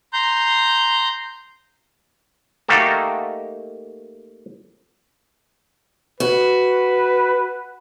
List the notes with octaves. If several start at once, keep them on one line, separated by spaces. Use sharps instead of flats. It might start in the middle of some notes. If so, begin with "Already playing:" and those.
A#5 C6 G6
A3 A#3 D#4 F#4 G4 A4
F#4 B4